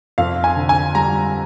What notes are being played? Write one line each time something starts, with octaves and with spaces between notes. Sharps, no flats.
F2 F5
G#5
D3
G#5
G3 A#5